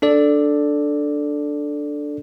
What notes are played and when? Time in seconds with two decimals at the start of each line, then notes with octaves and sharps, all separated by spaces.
0.02 D4 A4 D5